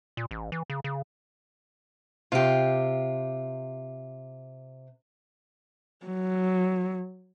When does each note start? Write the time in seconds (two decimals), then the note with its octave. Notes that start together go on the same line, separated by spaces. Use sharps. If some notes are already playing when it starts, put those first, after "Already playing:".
0.17 A#2
0.31 A1
0.52 E3
0.70 C#3
0.84 C#3
2.32 C3 F4 G4
6.06 F#3